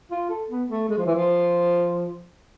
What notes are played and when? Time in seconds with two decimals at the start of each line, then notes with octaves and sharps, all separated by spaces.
0.11 F4
0.30 A4
0.50 B3
0.70 A3
0.89 G#3
0.98 F3
1.06 E3
1.15 F3